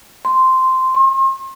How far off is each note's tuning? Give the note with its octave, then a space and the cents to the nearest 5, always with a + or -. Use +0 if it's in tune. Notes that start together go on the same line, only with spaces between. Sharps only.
C6 -5
C6 +40